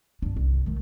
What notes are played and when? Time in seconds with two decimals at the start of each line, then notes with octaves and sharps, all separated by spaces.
0.22 G2 D4
0.36 C2
0.66 D#3 A3